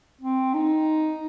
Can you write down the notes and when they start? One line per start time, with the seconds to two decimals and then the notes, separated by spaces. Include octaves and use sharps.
0.21 C4
0.54 D#4